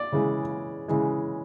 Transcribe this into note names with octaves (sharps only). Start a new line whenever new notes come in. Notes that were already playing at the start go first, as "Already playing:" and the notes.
Already playing: D5
C#3 E3 G#3
C#3 E3 G#3